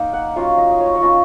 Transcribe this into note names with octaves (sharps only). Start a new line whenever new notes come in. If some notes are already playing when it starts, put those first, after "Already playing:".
Already playing: A#3 D#4
F#5
F#3 C#4 F4 F5
D#5
D#5
C#5
C#5
A#3 C#4 F4 D#5